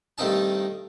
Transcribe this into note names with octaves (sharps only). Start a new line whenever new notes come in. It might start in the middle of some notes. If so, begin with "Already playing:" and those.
G2 D#3 A3 C4 D#4 A5